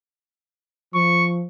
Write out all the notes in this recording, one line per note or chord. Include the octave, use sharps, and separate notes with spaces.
F3 C#6